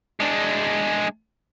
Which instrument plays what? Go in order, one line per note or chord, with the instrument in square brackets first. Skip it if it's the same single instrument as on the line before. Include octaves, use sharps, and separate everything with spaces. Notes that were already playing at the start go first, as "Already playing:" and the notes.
[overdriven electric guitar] G#3 D4